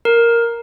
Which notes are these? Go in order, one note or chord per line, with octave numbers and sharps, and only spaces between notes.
A#4